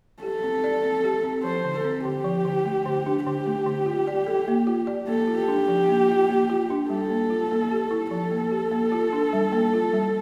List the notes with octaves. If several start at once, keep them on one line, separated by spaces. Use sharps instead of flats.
G4 A4
C4
D5
C4
G4
C4
F3 C5
D3
A4
C4
D3 G4
F3
D3
A3
D3
D4
D3 G4
A3
D3
F4
D5
A4
A#3
F4
D5
A#3 A4
F4
G4
D4
F3
A#3
F4
A#3
F4
D4
G3 A4
A#3
F4
A#3
G4
E4
F3 A4
A#3
G4
A#3
F4
D4
G3
A#3
F4
G3